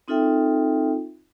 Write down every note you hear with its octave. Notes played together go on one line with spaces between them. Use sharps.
C4 D#4 F4 A4 E5 G5